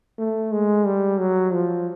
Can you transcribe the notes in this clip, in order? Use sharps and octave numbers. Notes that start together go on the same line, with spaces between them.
A3
G#3
G3
F#3
F3